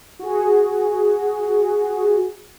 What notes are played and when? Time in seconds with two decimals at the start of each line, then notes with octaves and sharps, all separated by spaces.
0.19 F#4 G#4